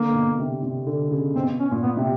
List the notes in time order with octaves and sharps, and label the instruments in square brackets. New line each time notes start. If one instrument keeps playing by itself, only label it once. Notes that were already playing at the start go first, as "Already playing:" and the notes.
Already playing: [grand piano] D3 [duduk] A#3
[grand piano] B2
C3
C3
D3
C#3
[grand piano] B2 [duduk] C4
[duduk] C#4
[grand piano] A#2
[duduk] B3
[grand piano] C3